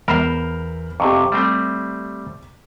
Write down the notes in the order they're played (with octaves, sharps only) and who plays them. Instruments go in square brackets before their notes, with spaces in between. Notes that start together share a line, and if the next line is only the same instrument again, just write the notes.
[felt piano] E2 B5 F6 [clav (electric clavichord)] A#4 C5
[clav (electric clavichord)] F2 C3 [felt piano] G4 C#6
[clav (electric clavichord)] G3 A3 C4